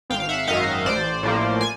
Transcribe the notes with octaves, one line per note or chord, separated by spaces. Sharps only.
G#1 F5 G5
F5
E5 F#5
F#2 D#3 D#5 F5
A1 C5 D5
A2 F3 A#3
G#5